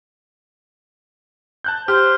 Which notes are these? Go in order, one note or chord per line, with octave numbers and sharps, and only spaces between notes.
A5 F#6 G6
G4 C5 F6